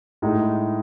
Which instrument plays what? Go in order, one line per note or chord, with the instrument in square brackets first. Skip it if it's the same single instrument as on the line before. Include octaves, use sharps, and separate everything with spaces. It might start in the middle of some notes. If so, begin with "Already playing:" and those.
[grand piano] A2 G#3 D#4